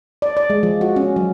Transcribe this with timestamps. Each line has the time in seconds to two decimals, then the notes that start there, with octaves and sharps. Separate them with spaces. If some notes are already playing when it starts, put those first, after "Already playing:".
0.22 D5
0.37 D5
0.50 G#3
0.63 F3
0.81 F#4
0.96 C#4
1.16 F#3